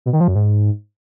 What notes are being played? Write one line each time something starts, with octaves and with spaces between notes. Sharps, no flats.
B2
D#3
F3
F#2
G#2